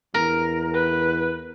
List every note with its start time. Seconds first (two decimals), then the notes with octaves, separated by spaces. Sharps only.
0.14 E2 A#4
0.75 B4